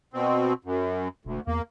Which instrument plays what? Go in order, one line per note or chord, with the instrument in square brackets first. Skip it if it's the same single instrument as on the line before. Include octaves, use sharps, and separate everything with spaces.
[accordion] B2 C4
F#2
[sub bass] E1 [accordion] D2
[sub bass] E2 [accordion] A#3